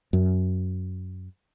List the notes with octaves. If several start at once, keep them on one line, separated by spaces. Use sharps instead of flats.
F#2